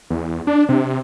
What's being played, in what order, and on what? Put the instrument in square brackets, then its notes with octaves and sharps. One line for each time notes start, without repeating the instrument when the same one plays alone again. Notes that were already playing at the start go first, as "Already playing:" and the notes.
[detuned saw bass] E2
D4
C3